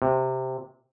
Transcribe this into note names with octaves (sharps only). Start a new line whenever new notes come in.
C3